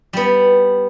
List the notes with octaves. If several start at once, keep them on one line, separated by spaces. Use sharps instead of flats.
G3 B3